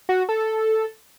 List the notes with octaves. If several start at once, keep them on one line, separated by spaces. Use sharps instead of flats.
F#4
A4